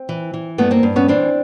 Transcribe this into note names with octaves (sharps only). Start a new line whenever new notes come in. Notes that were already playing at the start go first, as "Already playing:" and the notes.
Already playing: C4
E3
E3
G2 A3 B3
A#3 C4
G2
B3 C#4
E3 C4 D4